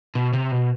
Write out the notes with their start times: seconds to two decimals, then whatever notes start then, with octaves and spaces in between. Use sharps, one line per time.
0.15 B2
0.33 C3
0.52 B2